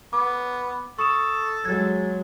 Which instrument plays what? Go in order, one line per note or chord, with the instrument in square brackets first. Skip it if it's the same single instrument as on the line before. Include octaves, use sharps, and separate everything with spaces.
[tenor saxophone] B3 [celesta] D6
[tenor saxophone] A4 [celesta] C#6 D#6 E7
[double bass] F#3 G#3 [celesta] G#6 A6